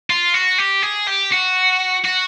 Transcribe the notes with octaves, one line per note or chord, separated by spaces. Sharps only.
F4
F#4
G4
G#4
G4
F#4
F#4